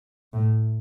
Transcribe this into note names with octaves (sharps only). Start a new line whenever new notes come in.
A2